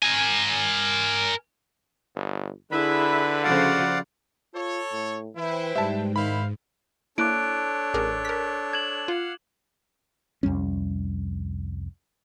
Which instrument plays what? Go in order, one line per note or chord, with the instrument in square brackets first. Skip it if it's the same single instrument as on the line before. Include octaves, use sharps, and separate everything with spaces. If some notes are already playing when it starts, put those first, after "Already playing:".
[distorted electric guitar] A#4 G#5
[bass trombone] G1
[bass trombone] D3 [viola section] E4 G#4 E5 [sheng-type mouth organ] B4 B5
[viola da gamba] C#3 F3 [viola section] F#4 A4 C5 [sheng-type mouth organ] D5 F5 F#5
[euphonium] F4 [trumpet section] A4 C#5
[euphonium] A2
[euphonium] E3 [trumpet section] E4 [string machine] B4 C5 G5
[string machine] G#2 [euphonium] G3 [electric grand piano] E5 A5
[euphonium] D#3 [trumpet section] E4 C5 F5 [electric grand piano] B5
[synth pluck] A#3 E4 [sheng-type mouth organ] D4 A4 C#5 [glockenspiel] D6 F#6 D7
[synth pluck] A1 G#4 A#4 [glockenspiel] D6
[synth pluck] A#4 B6
[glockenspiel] G#6 E7 F#7
[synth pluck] F4 [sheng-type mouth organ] F5 F#5
[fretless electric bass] C2 F2 G3 C#4